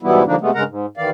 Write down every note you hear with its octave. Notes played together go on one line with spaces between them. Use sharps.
G#2 B2 E3 G3 B3 E4
D3 F3 G3 A#3 D4 D#4
C3 G#3 A3 B3
G2 C#3 G#3 A#4 F#5 A#5
G#2
D#2 D#3 E3 D5 F5